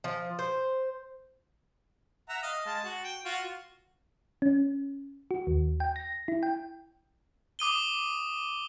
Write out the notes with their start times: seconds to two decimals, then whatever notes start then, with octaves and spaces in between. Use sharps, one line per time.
0.04 F3
0.39 C5
2.29 E5 F#5 A#5
2.43 D#5 F5
2.65 G#3 A5
2.84 F#4
3.04 G5
3.25 F4 F#4
4.42 C#4
5.31 F#4
5.47 D#2
5.80 G5
5.96 A#6
6.28 E4
6.43 G5
7.59 D6 D#6 D#7 G7